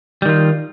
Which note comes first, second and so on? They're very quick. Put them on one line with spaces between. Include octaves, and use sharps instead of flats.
G3 D#3 F4